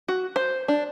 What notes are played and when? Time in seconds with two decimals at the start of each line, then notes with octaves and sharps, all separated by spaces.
0.08 F#4
0.36 C5
0.68 D4